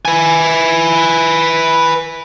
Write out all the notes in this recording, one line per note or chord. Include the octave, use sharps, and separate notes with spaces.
B4 G#5